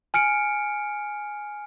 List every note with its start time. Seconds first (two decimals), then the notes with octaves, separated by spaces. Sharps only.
0.14 G#5 F6 C#7 D7